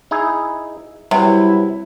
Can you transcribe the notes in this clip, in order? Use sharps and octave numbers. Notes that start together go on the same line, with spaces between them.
D#4 E4 G#4
C3 F#3 G3 E4 B4